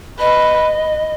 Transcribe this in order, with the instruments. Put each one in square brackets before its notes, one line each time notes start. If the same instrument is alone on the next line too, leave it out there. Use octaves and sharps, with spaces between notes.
[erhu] B4 [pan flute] D#5